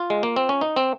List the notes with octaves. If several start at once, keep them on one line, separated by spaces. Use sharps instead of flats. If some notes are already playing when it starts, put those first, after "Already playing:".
Already playing: F4
G#3
A#3
C4
C#4
D#4
C4